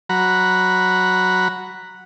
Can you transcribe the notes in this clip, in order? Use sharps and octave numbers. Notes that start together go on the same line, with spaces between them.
F#3 F#5 A#5 B5